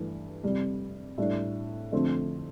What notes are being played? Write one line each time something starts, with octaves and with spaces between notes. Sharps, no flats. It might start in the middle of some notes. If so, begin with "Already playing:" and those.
Already playing: G2 E3 A3 D4
F2 C3 G3
A2 G3 D4
F2 D3 F3 A3 C4